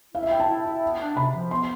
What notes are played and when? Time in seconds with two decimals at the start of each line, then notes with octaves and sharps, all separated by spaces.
0.14 E4 F5
0.23 E5
0.31 E4 G5
0.40 A5
0.48 E4
0.66 E4
0.83 B3
1.00 D4
1.17 C3 B5
1.34 F3
1.51 B3 C6